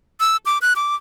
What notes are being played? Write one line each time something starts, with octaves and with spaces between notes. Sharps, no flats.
E6
D6
F#6
D6